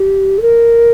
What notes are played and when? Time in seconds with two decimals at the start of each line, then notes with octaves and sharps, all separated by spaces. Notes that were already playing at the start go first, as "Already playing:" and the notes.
Already playing: G4
0.38 A4
0.42 A#4